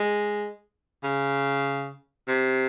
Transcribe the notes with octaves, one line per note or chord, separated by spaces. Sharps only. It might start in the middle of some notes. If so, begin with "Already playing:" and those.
Already playing: G#3
C#3
C3